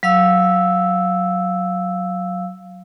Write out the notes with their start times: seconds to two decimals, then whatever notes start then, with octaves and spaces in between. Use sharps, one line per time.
0.03 F#3 F5 E6